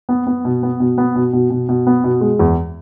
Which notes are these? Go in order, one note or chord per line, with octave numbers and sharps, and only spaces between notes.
B3
B3
B2
B3
B2
B3
B2
B2
B2
B2
B3
B2
G#3
E2